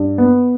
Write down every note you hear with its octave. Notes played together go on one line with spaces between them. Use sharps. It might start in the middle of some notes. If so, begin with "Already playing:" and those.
Already playing: G2
B3